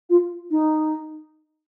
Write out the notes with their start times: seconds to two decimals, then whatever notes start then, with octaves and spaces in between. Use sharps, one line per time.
0.10 F4
0.51 D#4